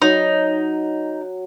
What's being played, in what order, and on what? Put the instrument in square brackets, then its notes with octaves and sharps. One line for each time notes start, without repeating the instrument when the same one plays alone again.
[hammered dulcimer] F#3 [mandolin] D#4